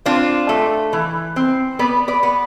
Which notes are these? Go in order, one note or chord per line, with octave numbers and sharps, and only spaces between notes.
C4 D4 F4
A3
E3
C4
B3 B4 D5
B4 D5
B3